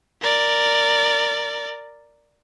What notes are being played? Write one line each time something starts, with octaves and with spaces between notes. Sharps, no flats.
A#4 D5